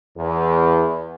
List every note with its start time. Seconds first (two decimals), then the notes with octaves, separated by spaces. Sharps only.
0.16 E2